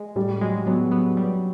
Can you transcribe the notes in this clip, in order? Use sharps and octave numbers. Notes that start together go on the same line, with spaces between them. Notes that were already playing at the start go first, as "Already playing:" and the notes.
Already playing: G#3
A2 G3
F#3 G#3
F#3 B3
B3
G3